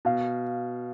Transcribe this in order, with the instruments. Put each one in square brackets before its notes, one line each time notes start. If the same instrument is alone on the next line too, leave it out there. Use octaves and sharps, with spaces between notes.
[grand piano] B2 [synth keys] F5